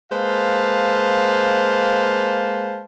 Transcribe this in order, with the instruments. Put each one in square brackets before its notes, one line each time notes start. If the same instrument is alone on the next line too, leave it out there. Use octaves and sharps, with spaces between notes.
[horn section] G#3 A#3 B4 C5 F5 A5